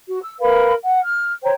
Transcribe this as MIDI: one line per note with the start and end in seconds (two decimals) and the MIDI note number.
0.07 0.21 66
0.21 0.33 88
0.39 0.72 70
0.39 0.72 71
0.39 0.72 77
0.39 0.72 83
0.84 0.98 78
1.02 1.31 89
1.43 1.52 72
1.43 1.52 73
1.43 1.52 79
1.43 1.52 82